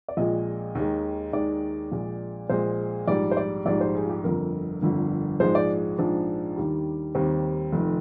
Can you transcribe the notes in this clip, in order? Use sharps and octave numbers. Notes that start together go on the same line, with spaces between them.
D5
A#1 A#2 G#3 D#5
D#2 D#3 G#3
D#2 D#3 G#3 D5
A#1 A#2 G#3
A#1 A#2 G#3 C5
A#1 G#2 G3 D5
C5
D5
A#1 G#2 G3 D5
C5
G#4
F4
G4
G1 F2 D3 A#4
G1 F2 D3
A#1 G#2 F3 G#3 C5
D5
A#1 G#2 F3 G#3 D4
D#2 D#3 G3
D#2 D#3 G3 C4
F1 F2 D#3